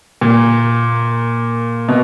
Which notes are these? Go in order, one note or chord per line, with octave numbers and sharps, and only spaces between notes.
A#2
B2